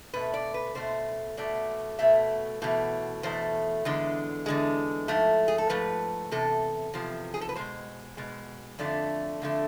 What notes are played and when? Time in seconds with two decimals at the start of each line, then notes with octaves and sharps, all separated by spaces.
0.14 B2 A3 B4
0.34 D5
0.54 B4
0.75 B2 A3 C5
1.37 B2 A3 D5
1.99 B2 A3 E5
2.62 E2 B2 A3
3.23 E2 B2 A3 C5
3.85 E2 D3 G#3
4.46 E2 D3 G#3
5.08 G#2 F3 A3
5.48 G#4
5.58 A4
5.70 G#2 F3 A3 B4
6.31 E2 C3 A4
6.94 E2 C3 F3
7.34 G#4
7.41 A4
7.49 B4
7.56 B2 G#3 C5
8.17 B2 G#3
8.79 F2 D3 A3 D5
9.42 F2 D3 A3